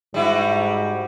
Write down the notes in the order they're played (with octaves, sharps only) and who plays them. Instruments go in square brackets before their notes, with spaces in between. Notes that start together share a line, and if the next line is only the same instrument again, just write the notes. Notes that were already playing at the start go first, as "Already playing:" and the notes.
[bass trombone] G#2 [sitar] G3 E4 F#4